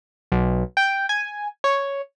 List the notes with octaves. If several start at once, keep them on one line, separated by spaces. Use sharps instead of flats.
B1
G5
G#5
C#5